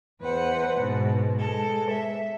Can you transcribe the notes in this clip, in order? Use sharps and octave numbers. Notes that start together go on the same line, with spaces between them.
E2 B4 C5 F#5
G#2 B2
G#3 A4
E5